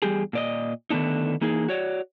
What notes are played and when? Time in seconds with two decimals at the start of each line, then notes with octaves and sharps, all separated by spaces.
0.02 E2 G3 G4 G#4
0.33 A#2 D5 D#5
0.90 D3 D#3 A3 B3 D4 D#4
1.41 E3 A#3 D#4 G#4
1.68 F#4 C#5 D5